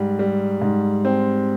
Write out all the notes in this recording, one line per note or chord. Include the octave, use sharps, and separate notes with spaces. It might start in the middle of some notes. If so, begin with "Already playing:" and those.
Already playing: G#2 G3
G3
G#2
C4